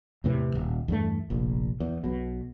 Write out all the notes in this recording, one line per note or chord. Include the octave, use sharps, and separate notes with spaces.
E2 A2 C3 E3
D#1
E2 G2 A3
F1 A#1
E2
B1 B2